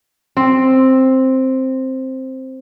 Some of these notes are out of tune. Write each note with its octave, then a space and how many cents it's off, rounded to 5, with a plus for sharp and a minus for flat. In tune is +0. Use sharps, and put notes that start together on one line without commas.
C4 +5